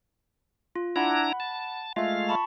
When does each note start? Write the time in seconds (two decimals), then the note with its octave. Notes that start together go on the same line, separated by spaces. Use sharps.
0.76 F4
0.96 D4 E4 F#5 A#5 B5
1.40 A5
1.96 G#3 A3 F4 E5 F5
2.29 A5 B5 C#6